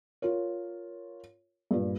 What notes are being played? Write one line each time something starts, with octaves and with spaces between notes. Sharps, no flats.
F4 A#4 C#5
G2 A#2